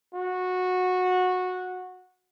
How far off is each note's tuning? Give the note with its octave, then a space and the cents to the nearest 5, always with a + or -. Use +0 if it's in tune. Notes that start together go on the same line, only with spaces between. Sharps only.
F#4 -15